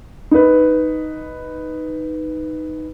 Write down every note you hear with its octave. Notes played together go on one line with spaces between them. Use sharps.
D#4 B4